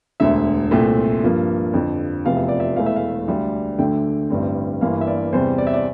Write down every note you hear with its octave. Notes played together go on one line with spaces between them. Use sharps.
E1 D2 D3 E5
C2 A#2 A3 C4
G2 F3 A#3
F2 D3 F3
F1 E2 C3 F3 F5
E5
D5
E5
E1 E2 E3 A3 F5
E5
F5
D2 D3 G3 D4
D2 D3 A3 G5
A1 G2 D3 G3 C4
G1 G2 E3 A#3 F5
E5
D5
E2 C3 G3 C4 C5
D5
E5
D5